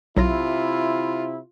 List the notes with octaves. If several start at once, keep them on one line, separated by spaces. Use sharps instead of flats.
B1 C3 F#3 E4 F4 A#6